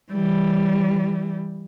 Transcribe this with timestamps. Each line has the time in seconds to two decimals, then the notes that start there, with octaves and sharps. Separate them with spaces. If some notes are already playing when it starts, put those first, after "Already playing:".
0.11 E3 G3